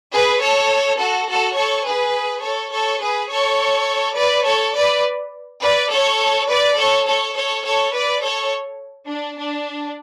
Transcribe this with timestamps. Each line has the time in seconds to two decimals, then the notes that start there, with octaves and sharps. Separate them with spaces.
0.12 G#4 B4
0.40 A4 C#5
0.99 F#4 A4
1.28 F#4 A4
1.56 A4 C#5
1.85 G#4 B4
2.43 A4 C#5
2.72 A4 C#5
3.01 G#4 B4
3.30 A4 C#5
4.17 B4 D5
4.46 A4 C#5
4.75 B4 D5
5.61 B4 D5
5.91 A4 C#5
6.48 B4 D5
6.77 A4 C#5
7.06 A4 C#5
7.36 A4 C#5
7.65 A4 C#5
7.94 B4 D5
8.22 A4 C#5
9.08 D4
9.37 D4